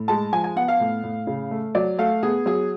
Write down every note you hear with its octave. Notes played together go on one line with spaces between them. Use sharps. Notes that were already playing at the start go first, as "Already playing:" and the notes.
Already playing: A2
G#3 A5
F3 G#5
G#5
B3 F#5
F5
A2
A2
C#3
A3
F#3 D5
A3 F5
B3 G#4
F#3 G#4